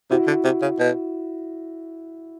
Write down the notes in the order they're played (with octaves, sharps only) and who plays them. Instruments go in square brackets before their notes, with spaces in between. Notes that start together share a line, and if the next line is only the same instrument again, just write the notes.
[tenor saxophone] C3 [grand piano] E4 F#4
[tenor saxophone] D3
C3
C#3
B2